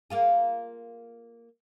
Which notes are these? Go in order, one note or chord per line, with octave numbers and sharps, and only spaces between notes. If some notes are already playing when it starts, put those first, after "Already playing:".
A#3 F4 G#4